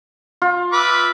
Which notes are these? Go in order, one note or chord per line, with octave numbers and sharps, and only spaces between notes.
F4
B4 E5 D6